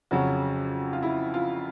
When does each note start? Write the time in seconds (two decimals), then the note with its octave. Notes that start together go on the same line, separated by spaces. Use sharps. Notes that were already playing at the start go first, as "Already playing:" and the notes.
0.11 F2 C#3 F#3 F#4
0.93 F4
1.03 E4
1.34 F4